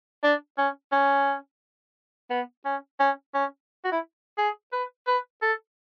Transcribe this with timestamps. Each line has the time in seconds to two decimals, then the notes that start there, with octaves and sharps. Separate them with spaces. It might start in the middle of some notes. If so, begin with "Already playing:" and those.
0.24 D4
0.58 C#4
0.92 C#4
2.30 B3
2.65 C#4
3.00 C#4
3.34 C#4
3.85 F#4
3.92 E4
4.38 G#4
4.73 B4
5.07 B4
5.42 A4